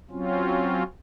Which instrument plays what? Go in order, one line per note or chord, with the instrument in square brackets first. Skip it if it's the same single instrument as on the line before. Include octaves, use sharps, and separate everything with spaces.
[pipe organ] F#3 C4 C#4 F4